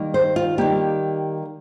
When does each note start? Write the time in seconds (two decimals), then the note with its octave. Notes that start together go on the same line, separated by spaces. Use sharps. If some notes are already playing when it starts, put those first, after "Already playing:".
Already playing: D#3 G3 A#3
0.14 C5
0.36 F4
0.58 D#3 G3 A#3 G4